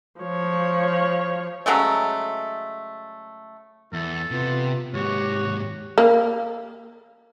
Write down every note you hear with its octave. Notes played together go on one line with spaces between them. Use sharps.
F3 C#5
C#3 F#3 G#3 A3
E2 E4 A4
C3 B3 F4
D#2 G#2 F#4 G4 C#5
A#3